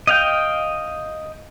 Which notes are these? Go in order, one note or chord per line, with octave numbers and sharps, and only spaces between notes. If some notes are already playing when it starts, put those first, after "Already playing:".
D#5 F5 G5